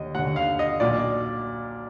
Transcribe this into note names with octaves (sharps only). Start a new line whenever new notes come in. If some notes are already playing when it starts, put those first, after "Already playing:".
Already playing: D#2 D3 D#5
D#2 D3 F#5
F5
D#5
B1 A#2 D5